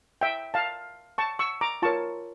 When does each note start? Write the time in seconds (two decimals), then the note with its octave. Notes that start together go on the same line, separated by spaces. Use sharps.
0.21 E5 G5
0.54 F5 A5
1.18 A5 C#6
1.39 C#6 E6
1.61 A#5 D6
1.82 F4 A#4 C#5 A5 C#6